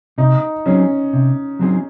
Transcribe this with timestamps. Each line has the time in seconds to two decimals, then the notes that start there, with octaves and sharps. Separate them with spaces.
0.18 C3 D#4
0.66 F#3 C4 C#4 D#4 G#4
1.13 C3
1.59 F#3 C4 D#4 G#4